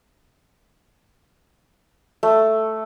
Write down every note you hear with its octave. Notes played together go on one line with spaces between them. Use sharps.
A3